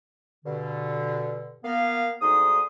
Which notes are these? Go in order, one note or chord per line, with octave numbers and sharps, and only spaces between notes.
G2 B2 D3
A#3 B3 F5
D2 G#2 D#4 C6 D#6